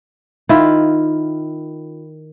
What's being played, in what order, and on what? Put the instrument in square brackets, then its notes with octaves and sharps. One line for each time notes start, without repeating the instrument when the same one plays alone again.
[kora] D#3 E4 F4